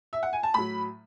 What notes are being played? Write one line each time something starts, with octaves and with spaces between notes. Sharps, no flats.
E5
F#5
G#5
A5
A2 F#3 B5